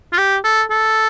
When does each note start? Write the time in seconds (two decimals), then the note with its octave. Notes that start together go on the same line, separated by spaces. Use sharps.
0.13 F4
0.18 G4
0.44 A4
0.71 A4